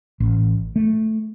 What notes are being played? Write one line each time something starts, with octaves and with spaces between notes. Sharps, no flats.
A1
A3